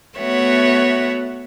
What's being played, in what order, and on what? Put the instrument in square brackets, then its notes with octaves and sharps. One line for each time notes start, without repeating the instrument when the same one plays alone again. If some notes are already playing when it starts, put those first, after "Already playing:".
[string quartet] A3 B3 F#4 C#5 E5 F#5